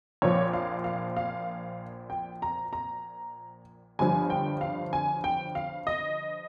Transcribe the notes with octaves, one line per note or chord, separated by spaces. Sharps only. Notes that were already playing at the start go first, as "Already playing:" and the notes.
A#1 A#2 F3 C#5
F5
F5
F5
G5
A#5
A#5
G1 G2 F3 G#5
G5
F5
G#5
G5
F5
D#5